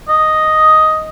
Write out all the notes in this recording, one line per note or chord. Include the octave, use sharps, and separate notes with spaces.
D#5